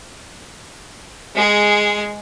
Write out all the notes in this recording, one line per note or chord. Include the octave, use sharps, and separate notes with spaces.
G#3 G#4